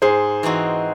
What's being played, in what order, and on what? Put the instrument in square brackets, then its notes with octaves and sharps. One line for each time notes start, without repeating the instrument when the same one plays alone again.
[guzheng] G#2 [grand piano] G#4 C5
[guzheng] E3 C4 D#4 F#4